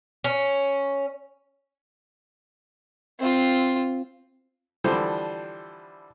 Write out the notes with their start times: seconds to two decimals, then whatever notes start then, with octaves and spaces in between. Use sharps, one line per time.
0.24 C#4
3.19 C4 F4
4.84 D3 E3 F3 G3 D4 C5